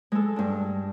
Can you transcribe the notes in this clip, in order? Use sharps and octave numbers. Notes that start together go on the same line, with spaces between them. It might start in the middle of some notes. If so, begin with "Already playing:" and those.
G#3 A4
G2 D4